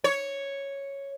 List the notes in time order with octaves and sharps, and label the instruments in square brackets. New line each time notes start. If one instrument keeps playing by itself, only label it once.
[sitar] C#5